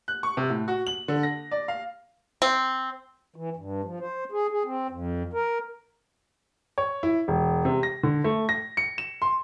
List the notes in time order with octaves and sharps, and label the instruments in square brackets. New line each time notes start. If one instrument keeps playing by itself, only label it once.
[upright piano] F#6
C#6
C3
A2
F#4
F#7
D3
A#6
D5
F5
[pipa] C4
[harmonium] E3
G2
F3
C5
G#4
G#4
C4
F2
A#4
[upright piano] C#5
E4
E1
C3
A#6
D3
A3
A#6
C#7
E7
C6